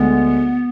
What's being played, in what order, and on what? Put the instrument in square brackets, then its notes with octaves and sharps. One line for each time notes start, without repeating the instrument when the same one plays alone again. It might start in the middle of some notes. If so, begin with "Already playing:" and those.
Already playing: [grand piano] D2 D3 G#3 [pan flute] B3